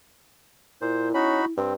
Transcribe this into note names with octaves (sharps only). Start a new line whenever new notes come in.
A#2 E4 C5
C#4 D#4 F#4 B5
G2 C4